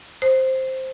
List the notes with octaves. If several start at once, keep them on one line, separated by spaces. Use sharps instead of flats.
C5